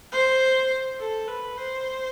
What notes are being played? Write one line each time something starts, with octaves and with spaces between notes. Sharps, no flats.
C5
A4
B4
C5